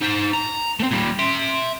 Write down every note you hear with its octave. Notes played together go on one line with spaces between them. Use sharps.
D#4 C5
A#5
A3 C4
A#2 G3
E5 C6